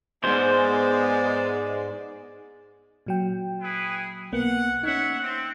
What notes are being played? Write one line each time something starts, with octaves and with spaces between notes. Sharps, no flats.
D2 G#2 G#3 B3 C5 D5
A#2 F#3 G5
E4 G#4 B4
B1 A#3 B3 F#5
C#4 D#4 C#5 E5 F#5
C4